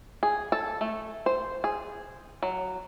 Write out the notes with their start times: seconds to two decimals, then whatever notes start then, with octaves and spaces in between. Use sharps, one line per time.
0.23 G#4
0.52 A4
0.81 A3
1.26 C5
1.64 G#4
2.43 F#3